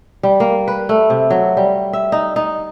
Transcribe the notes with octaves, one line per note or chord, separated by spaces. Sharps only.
G3
A#3
B4
A3
C3
F#3
G3
E5
D#4
D#4